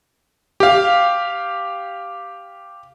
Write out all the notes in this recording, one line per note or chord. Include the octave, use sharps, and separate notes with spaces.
G4 F5